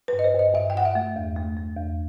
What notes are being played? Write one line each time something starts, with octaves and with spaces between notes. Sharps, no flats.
G2 B4
D#5
C5
G2
D#5
G2 E5
G5
G2 F#5
E5
A3
E2
A3
A3
E2